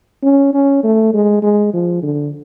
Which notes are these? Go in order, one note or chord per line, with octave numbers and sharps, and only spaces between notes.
C#4
C#4
A3
G#3
G#3
F3
D3